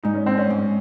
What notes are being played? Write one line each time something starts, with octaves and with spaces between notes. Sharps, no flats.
G#2 D#4
C#4
C4
C#4
G#2